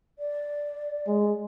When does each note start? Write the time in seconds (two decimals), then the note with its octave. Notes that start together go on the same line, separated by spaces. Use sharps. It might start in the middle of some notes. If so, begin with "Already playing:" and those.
0.19 D5
1.07 G#3